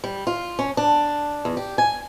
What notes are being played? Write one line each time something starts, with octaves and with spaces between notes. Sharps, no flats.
G3
F4
C#4
D4
E2
G4
G#5